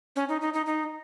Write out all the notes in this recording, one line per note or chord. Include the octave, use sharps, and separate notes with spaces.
C#4
D#4
D#4
D#4
D#4